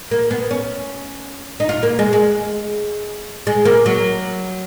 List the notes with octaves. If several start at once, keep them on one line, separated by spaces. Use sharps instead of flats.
A#3
B3
C#4
D#4
F4
A#3
G#3
G#3
G#3
A#3
F#3